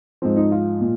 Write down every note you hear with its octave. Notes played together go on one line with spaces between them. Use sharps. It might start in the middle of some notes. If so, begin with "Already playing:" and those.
G#2 F3 C4
D#4
F4
A#2